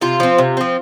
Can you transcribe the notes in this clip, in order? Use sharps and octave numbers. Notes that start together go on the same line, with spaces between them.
C3 F4
F3 C4
C3
F3 C4